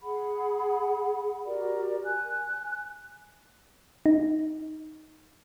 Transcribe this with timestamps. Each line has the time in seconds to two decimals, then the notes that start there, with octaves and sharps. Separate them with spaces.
0.01 G#4 F#5 B5
1.46 F#4 G4 A#4 D5
2.04 G#5 F#6
4.06 D#4